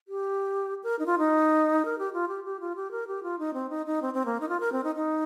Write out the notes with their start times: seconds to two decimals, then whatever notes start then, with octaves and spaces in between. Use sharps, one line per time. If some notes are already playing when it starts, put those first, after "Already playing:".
0.08 G4
0.83 A#4
0.99 D#4
1.06 F4
1.18 D#4
1.85 A#4
1.99 G4
2.13 F4
2.28 G4
2.44 G4
2.60 F4
2.76 G4
2.91 A#4
3.07 G4
3.23 F4
3.39 D#4
3.54 C4
3.70 D#4
3.86 D#4
4.02 C4
4.14 C4
4.26 A#3
4.40 D#4
4.49 F4
4.60 A#4
4.72 C4
4.84 D#4
4.95 D#4